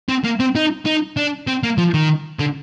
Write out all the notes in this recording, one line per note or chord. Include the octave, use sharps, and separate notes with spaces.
C4
A#3
C4
D#4
D#4
D4
C4
A#3
F3
D#3
D3